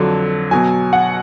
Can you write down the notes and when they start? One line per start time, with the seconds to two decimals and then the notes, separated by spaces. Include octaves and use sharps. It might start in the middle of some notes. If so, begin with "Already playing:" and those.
Already playing: F2 D3 F#3
0.51 B2 F#3 G#5
0.93 F#5